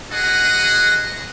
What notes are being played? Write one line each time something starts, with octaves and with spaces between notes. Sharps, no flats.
F#4 G#4 D#5 F#5